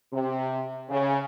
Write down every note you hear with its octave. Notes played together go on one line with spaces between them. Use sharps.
C3
C#3